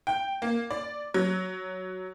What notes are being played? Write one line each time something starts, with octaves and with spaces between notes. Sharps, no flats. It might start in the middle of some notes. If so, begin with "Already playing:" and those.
G5
A#3
D5
F#3